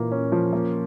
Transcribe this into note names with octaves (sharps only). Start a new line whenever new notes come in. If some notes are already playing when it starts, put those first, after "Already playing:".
Already playing: A#2 E3 A#3
C#4
F3
A#3